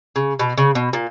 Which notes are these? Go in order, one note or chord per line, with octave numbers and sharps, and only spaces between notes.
C#3
B2
C#3
B2
A#2